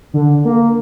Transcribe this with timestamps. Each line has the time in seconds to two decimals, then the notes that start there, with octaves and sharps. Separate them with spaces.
0.14 D3
0.45 A#3